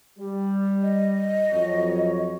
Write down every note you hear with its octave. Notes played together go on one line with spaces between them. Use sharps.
G3
D#5
F2 F#3 C#5